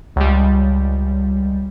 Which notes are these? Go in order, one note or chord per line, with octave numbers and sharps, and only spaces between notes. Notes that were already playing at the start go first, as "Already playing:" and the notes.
C#2 G3